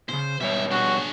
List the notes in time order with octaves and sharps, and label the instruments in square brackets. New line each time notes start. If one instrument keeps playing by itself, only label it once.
[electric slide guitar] A#2 C#3 [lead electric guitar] C5
[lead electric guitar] G#2 E5 [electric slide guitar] B2 G3 C#5
[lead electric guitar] D4 G#4 [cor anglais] F#4